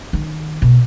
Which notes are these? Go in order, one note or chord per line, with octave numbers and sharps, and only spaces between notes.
D#3
B2